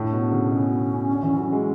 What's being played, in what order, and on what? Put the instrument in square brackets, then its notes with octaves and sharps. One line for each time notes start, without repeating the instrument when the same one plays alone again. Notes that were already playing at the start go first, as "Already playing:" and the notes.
Already playing: [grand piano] A2 [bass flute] D4
[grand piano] B2
C#3
[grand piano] B2 [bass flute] C#4
[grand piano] D3
E3
F#3
G#3